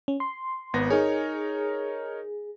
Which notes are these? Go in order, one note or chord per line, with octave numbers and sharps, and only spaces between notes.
C#4
C6
G#1 B3 A#6
D#4 G#4 A#4 C#5